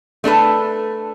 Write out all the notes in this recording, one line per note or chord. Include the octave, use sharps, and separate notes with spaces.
A3 D4 A4 B4